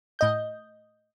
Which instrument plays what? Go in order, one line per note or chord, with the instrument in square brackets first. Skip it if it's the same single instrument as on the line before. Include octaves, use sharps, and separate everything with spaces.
[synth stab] A2 D#5 G6